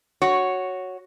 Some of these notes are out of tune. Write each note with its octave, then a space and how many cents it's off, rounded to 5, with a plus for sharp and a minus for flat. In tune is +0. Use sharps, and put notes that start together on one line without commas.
F#4 +0 C#5 +0